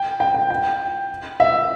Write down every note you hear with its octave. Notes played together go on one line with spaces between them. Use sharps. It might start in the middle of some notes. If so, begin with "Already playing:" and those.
Already playing: G5
G5
G5
G5
E5